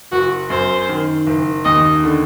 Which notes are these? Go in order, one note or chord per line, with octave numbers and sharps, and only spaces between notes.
F#1 F#4
F#2 C5
D#3
F#1
D#2 D#5
D3